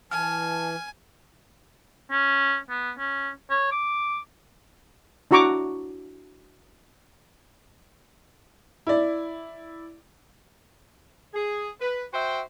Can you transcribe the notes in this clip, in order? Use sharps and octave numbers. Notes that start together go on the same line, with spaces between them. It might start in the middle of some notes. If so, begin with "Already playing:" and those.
E3 G#5 A5 F6
C#4
B3
C#4
C#5
D6
D4 E4 F#4 A#5 C#6 D6
E4 D5
G#4
B4
F#4 C5 E5 G5